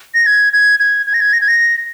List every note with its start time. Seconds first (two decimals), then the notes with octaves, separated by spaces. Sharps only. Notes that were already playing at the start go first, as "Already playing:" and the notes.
0.15 A#6
0.26 G#6
0.53 G#6
0.80 G#6
1.06 G#6
1.14 A#6
1.20 G#6
1.33 A#6
1.41 G#6
1.48 A#6